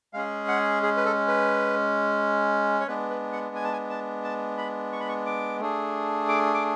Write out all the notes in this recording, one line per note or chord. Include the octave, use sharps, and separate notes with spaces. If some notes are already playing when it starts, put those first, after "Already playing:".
G#3 C#4 G#4 F5
F#5
G#4
B4
A4
B4
C#5
G#3 B3 D4 B4
B4
F#5
G#5
A5
G#5
A5
A5
B5
C#6
B5
C#6
D6
A3 D4 G#4
D6
D6